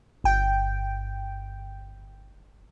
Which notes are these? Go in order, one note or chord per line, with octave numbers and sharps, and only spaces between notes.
G1 G5